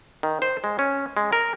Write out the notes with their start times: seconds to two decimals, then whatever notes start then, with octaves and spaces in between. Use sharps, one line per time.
0.23 D#3
0.42 C5
0.64 G#3
0.79 C#4
1.17 G#3
1.33 A#4